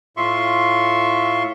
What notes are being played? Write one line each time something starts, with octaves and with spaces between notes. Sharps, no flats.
A2 F4 E5 C6 C#6